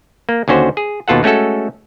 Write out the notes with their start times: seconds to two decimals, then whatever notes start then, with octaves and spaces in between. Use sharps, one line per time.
0.29 A#3
0.48 D#2 D3 C#4 F#4 C5
0.77 G#4
1.08 D#2 B2 F4 A4 F#5
1.23 G#3 A3 C#4 F#4 A4